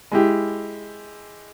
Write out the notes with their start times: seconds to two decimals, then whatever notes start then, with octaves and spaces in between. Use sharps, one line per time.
0.12 G#3 E4 G4